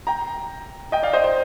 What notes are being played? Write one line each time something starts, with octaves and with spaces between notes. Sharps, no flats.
G5 A#5
D#5 G5
D5 F5
C5 D#5
C5